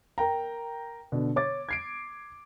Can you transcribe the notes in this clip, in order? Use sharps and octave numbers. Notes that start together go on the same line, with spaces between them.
A#4 G5 A#5
B2 D3
C#5 D6 A6
G#6 C7 D7